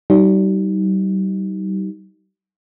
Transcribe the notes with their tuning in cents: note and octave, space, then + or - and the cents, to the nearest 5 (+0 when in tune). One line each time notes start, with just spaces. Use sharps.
G3 -35 D#4 +15